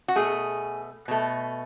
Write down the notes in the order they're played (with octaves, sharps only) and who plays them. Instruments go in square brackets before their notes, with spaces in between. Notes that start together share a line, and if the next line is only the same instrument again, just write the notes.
[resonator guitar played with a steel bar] F#4
B2 A3 G#4
B2 A3